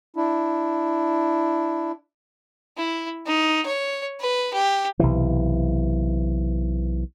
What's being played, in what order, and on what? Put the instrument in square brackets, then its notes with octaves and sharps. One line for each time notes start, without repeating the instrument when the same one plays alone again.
[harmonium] D4 E4
[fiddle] E4
D#4
C#5
B4
G4
[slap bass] B1 C3 E3